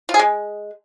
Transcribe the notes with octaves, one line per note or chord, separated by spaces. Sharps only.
F4
G#4
G#3